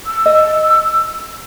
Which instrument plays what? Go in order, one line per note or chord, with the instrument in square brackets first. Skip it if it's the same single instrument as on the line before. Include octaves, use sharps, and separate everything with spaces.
[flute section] E6
[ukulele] D#5